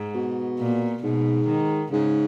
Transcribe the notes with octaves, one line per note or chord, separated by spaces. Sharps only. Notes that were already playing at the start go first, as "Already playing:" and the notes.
Already playing: G#2
B2
A#2
G#2 B2
D#3
G#2 C#3